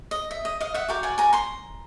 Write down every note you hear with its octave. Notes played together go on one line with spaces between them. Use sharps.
D#5
E5
D#5
D#5 F5
E5 F#5
F#4 A#4 D5 F5 G5
F#5 G#5
G#5 A#5
A#5 C6